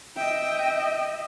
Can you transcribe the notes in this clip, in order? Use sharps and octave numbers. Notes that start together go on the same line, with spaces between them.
D#5 E5 G5